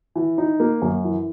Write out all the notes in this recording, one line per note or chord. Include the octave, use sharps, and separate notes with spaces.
E3
D#4
A#3
F#2
E3